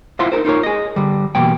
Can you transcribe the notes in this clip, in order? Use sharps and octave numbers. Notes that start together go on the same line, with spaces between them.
E4 F4 C5 E5 F#5 C6
D#4 A4 A#4 C5
D#4 F4 A#4 C#5
G#4 D#5
D3 G3
B2 E3 G3 A#3 G5